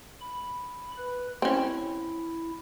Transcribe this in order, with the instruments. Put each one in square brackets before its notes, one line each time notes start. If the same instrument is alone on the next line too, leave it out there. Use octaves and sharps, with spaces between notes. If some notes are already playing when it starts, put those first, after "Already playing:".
[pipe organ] B5
B4
[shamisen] C4 C#4 [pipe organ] E4